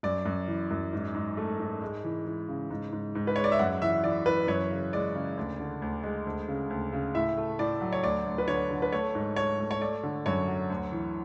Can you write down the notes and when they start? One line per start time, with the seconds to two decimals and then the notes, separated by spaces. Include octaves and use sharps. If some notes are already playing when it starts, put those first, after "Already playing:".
0.03 F#2 D5
0.26 F#2
0.48 E3
0.71 F#2
0.93 G#2
1.14 G#2
1.37 A3
1.59 G#2
1.82 G#3
2.04 E3
2.27 E3
2.49 C#3
2.70 G#2
2.92 G#2
3.15 G#2
3.27 B4
3.36 G#3 C#5
3.44 D5
3.52 E5
3.59 F#2 F#5
3.82 E3 E5
4.04 E3 D5
4.26 E3 B4
4.48 F#2 C#5
4.71 C#3
4.93 G#3 D5
5.15 C#3
5.37 D2
5.59 D3
5.82 D2
6.03 G#3
6.26 D2
6.48 C#3
6.70 D2
6.92 C#3
7.15 A2 E5
7.37 A3
7.59 A2 D5
7.81 F#3
7.93 C#5
8.04 D2 D5
8.26 D2
8.38 B4
8.48 D3 C#5
8.71 D3
8.82 B4
8.93 A3 C#5
9.15 G#2
9.36 G#2 C#5
9.59 A3
9.71 C#5
9.81 A3 D5
10.03 D3
10.26 F#2 C#5
10.48 F#3
10.70 D2
10.92 E3